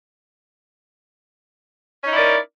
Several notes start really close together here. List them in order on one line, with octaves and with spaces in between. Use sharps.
C#4 D#4 E4 D5 A#4